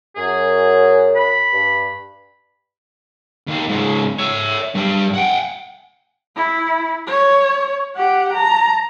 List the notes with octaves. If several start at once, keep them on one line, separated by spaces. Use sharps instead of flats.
F#2 G#4
B5
G2
D#2
G#2 C#3
C#5 E5
G2 G3
F#5 G5
E4
C#5
G4 F#5
A5 A#5